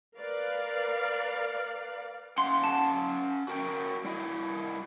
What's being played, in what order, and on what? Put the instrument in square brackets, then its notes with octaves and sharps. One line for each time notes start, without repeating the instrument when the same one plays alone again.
[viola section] A#4 B4 D5 F5
[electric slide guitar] C#4 F5 F#5 [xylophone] C6
[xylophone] A5
[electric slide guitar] F#4 A#4 G5
G3 E4 D#5